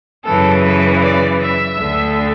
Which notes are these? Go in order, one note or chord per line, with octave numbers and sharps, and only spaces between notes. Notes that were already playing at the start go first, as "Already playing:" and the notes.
F#2 C#3 E3 A4
B4
D5
E5
D2 D3